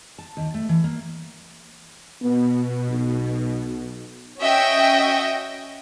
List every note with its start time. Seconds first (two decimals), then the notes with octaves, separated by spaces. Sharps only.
0.18 A5
0.37 D#2
0.54 A3
0.69 E3
0.84 A#3
2.22 B2 B3
2.88 B1
4.39 C#4 F#4 D#5 E5 G5